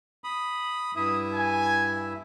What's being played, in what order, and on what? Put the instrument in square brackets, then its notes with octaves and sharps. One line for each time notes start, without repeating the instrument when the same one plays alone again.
[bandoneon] B5 D#6
[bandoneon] G2 E4 E5 [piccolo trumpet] D#6
[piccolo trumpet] G#5